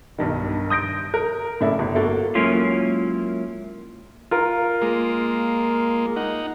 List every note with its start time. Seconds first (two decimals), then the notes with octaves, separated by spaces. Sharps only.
0.18 B1 G2 D#3
0.70 D#6 G6 A#6 D7
1.14 A#4
1.61 A2 C#3 D4 E4 A4
1.79 G1
1.95 A#3 F#4 A4
2.35 F#3 G#3 A#3 C#4 E4 F4
4.31 F4 A#4
4.81 G#3 A#3
6.16 D#4 F#5